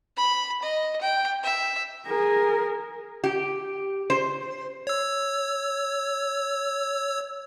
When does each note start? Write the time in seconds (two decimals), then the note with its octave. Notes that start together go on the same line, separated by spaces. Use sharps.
0.16 B5
0.62 D#5
1.01 G5
1.43 E5
2.07 G#4 A#4
3.24 G4
4.10 C5
4.87 C#5 E6